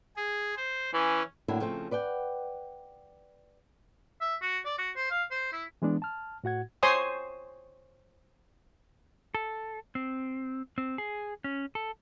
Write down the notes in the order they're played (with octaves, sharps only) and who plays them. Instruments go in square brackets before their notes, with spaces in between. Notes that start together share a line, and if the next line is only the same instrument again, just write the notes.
[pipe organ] G#4
C5
[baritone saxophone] E3 [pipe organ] C#4
[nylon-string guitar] A2 D3 F#3 A#3 D4 E4
C#3 F3 A3 C4
B4 D5 F#5 G5
[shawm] E5
F#4
D5
F#4
C5
F5
C5
E4
[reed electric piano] E3 G#3 B3 D4
A5 F6
A2 F#4 F#5 G#6
[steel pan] C5 C#5 G#5 C6 D#6
[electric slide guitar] A4
C4
C4
G#4
C#4
A4